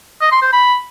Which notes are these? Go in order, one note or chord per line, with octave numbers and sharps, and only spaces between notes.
D#5
C6
C5
B5